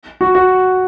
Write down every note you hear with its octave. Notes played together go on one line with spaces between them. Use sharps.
F#4
F#4